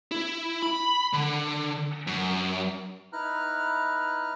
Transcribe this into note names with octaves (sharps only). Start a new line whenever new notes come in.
E4
B5
D3
F#2
D#4 E4 B4 A#5 F6 F#6